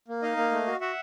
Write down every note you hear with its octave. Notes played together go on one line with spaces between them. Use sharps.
A#3
D#4 D#5 F5
A#3
A3
F#4
F#4 E5 F#5